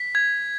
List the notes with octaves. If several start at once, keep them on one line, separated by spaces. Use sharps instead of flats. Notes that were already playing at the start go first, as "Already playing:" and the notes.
Already playing: B6
G#6